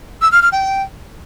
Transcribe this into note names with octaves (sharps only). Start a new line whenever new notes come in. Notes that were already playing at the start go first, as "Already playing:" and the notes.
E6
F6
F6
G5